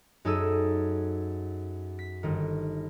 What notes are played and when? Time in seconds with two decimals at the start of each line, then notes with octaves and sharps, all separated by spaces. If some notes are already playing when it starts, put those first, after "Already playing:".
0.25 F#2 D#4 G#4 A4 E6 D#7
1.99 B6
2.23 G1 D#3